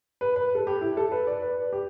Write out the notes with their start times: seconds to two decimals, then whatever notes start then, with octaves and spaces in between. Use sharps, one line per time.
0.21 B4
0.36 B4
0.55 A4
0.67 G4
0.81 E4
0.97 A4
1.12 B4
1.27 D5
1.42 B4
1.73 G4